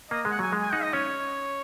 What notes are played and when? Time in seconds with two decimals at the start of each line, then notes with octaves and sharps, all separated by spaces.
0.10 A#3 D#5
0.25 G#3
0.31 F#5
0.39 F#3 G#5
0.53 G#3
0.62 G#5
0.73 D#4 F#5
0.83 D#5
0.93 C#4 C#5